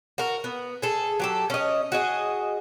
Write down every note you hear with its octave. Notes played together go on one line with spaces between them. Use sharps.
F#4 A#4
B3
G#4 A4
F#3 G4 A4
C#4 D#5
F#4 G#4 D#5